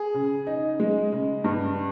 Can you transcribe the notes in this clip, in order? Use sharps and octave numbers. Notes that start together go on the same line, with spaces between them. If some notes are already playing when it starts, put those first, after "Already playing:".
Already playing: G#4
C#3
D#4
G#3
C#3
G2